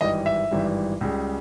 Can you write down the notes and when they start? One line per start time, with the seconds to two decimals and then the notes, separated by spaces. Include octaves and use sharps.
0.01 G#1 G2 E3 G3 D#5
0.26 E5
0.51 G#1 G2 E3 G3
1.01 C#2 C#3 G3